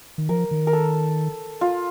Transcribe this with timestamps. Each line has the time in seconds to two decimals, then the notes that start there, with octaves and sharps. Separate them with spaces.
0.18 D#3
0.29 F3 A#4
0.51 D#3
0.67 A#4
0.73 A4
1.61 F4